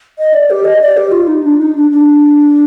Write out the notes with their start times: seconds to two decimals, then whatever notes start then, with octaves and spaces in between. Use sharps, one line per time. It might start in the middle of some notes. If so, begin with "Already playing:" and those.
0.18 D#5
0.34 D5
0.50 G4
0.65 D#5
0.81 D5
0.97 G4
1.12 F4
1.27 D#4
1.44 D4
1.59 D#4
1.75 D4
1.91 D4